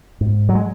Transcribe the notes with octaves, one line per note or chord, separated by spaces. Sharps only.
G#2
F#3
G#3